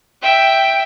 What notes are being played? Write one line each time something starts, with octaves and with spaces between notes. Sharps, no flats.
E5 G5